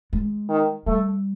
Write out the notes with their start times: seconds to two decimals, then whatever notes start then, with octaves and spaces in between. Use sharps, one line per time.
0.13 G#3
0.49 D#3
0.86 G3 A3